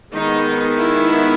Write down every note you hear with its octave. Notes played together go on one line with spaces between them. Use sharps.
D#3 G#3 B3 D#4
E4